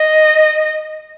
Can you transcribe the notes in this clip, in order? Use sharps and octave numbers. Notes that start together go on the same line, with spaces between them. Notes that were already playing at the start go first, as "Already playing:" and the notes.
Already playing: D#5